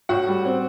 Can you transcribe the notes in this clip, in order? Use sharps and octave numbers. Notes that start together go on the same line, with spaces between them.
A2 F#4 F#5
G3
C4